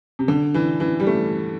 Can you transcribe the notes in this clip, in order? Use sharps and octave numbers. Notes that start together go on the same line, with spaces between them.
C3
D3
E3
E3
G3
A3